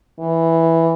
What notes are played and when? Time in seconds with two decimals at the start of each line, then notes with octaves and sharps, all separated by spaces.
0.20 E3